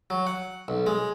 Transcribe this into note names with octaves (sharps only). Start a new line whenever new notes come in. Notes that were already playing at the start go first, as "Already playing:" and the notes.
F#3
F#5
B1
G#3